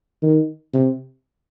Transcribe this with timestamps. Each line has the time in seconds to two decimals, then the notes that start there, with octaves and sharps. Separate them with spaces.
0.23 D#3
0.74 C3